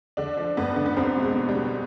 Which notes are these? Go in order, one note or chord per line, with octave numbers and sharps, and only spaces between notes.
D3 D4
F3
G1 B3
D3
B3
C2 C4
B2
G#3
B2
G3
B2